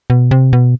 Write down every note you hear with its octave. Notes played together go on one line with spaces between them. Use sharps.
B2
C3
B2